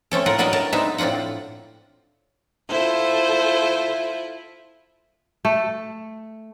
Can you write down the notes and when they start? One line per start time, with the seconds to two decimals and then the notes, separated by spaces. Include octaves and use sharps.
0.11 A3 C4 C#4 A4
0.26 A2 F4 A#4 F#5
0.39 F#3 D4 F#4 A#4 B4 D#5
0.53 A2 A#4 A5
0.73 G#3 B3 C4 D4 D#4 E5
0.98 A2 C4 D4 F4 F#5
2.70 E4 F4 A4 C5
5.45 A3